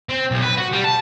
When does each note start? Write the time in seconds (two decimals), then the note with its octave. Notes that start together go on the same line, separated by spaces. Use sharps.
0.09 C4
0.31 B1
0.42 B4
0.57 F#4
0.73 G3
0.84 A5